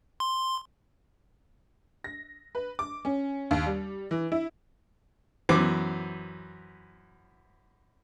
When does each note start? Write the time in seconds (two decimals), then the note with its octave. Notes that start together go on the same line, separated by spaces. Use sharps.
0.20 C6
2.04 A#6
2.55 B4
2.79 D6
3.05 C#4
3.51 D#2
3.66 G3
4.11 E3
4.32 E4
5.49 F#2 E3 B3 C5 D6